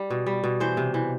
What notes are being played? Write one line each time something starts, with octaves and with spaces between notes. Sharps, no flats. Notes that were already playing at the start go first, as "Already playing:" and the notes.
Already playing: G3
B2
G3
B2
E3 C5
C3
E3